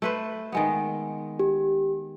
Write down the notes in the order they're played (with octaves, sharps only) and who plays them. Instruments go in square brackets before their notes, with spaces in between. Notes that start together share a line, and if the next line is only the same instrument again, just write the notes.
[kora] A3 B4 C5
D#3 G#3 B3
[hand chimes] G4